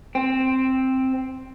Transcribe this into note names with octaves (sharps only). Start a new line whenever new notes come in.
C4